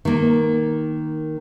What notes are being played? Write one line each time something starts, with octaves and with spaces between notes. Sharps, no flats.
D#3 A#3